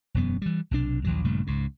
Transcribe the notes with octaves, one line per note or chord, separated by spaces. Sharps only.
E1 F#2 B3
E3 G3
B1 C3 D4
A#1 D#2 F#3
A#1 G2 C#3 A3
C#2 G#2